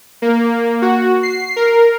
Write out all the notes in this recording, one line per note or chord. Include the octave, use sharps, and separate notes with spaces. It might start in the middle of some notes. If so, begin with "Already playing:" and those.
A#3
F#4
C7
A#4